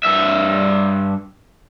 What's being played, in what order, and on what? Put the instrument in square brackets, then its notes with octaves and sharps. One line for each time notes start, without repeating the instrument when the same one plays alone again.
[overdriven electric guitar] G2 E5